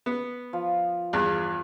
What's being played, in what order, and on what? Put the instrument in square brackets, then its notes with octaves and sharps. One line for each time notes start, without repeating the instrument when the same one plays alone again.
[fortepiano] B3
[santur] F3
[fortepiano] E2 G2